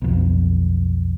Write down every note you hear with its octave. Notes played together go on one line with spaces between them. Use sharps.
B1 F2